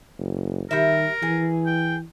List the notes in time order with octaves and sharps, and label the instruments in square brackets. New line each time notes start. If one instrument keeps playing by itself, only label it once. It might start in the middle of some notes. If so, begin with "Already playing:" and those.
[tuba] F#1
[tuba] D#3 [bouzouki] G3 E5 [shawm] A#4
[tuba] E3 [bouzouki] G#4
[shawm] G5